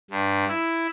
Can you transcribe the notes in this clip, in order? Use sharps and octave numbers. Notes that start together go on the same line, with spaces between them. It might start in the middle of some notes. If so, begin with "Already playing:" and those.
G2
E4